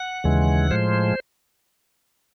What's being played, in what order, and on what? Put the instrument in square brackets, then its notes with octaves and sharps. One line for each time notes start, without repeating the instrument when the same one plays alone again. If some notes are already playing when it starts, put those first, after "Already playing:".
Already playing: [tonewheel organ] F#5
D#2 C#3 E3 G#3
A2 F3 G#3 C5